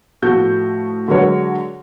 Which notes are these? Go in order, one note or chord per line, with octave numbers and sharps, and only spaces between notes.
A2 F3 A3 F#4 G6
D3 F#3 G#3 F#4 A#4 C#5